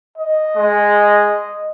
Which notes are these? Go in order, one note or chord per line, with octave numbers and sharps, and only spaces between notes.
D#5
G#3